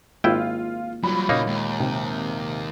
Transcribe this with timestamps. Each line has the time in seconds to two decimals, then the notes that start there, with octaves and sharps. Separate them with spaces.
0.24 G#1 A#3 E4 F4 G5
1.04 F#3 G3 F4 B5
1.29 A#2 C#3 A#3 D#4 F#4 C#5
1.47 D#2 G#3
1.80 C3